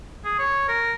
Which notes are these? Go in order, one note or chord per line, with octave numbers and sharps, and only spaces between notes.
G#4
C#5
A#4